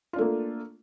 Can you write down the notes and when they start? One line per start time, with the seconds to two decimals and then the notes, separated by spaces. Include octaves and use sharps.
0.13 F4
0.16 D4
0.18 A3
0.21 A#3